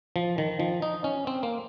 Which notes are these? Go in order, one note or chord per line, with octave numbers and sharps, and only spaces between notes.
F3
D#3
F3
D#4
C#4
C4
A#3